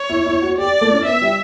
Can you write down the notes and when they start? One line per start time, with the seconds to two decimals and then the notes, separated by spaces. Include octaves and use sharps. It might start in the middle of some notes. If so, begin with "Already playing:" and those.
Already playing: C#5
0.10 E4
0.26 E4
0.42 F#4
0.58 G4 D5
0.81 A3
0.93 C#4
1.06 B3 E5
1.21 G3